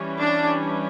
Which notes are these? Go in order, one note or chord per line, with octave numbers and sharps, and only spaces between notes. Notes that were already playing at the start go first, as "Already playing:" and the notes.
Already playing: E3 G3 C#4
D4